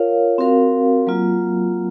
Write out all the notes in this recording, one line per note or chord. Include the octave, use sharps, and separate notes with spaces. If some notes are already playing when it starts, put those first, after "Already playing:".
Already playing: F4 A#4 C#5 F5
C4 F#4 A#4 F5
F#3 A#3 F4